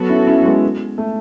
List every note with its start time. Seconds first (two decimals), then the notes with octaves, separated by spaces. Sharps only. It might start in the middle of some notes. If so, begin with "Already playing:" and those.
Already playing: F#3 B3 F#4 A4
0.09 C#4 E4
0.27 C#4 E4
0.45 G#3 B3
0.98 A3